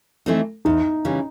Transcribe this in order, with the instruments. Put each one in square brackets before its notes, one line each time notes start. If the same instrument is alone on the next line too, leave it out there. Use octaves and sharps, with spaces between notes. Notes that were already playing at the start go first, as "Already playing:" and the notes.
[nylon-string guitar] E3 A3 C4 D#4
[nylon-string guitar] E2 [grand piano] D#4
[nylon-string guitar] C#3 E3 G3